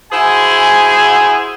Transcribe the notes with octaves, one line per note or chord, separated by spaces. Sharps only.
E4 F#4 G#4 C5 G#5